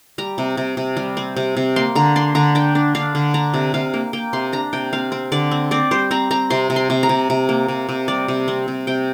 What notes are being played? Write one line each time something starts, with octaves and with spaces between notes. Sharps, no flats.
G3 A#5
C3
C3
C3
G3
C4
C3
C3
A#3 C6
D3 A#5
D4 C6
D3 A#5
D4 G5
D4
D4 F5
D3
D4 A#5
C3
C3 F5
A#3
A#3 G5
C3 C6
D4 A#5
C3 G5
C4 F5
C4
D3 D5
C4
C4 D5
G3 C5
C4 A#5
C4 A#5
C3 C6
C3
C6
C3
A#5
C3
C3
A#3
C3
C3
G3 D5
C3
C4
C3
C3 G5